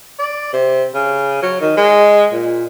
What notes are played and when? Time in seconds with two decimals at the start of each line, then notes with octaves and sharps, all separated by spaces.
0.19 D5
0.53 C3
0.94 C#3
1.43 F#3
1.61 D#3
1.77 G#3
2.32 A#2